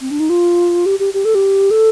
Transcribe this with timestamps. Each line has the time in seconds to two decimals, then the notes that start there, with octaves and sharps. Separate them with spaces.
0.01 C4
0.11 D4
0.20 D#4
0.30 F4
0.86 G4
1.00 G4
1.14 G4
1.25 A4
1.35 G4
1.71 A4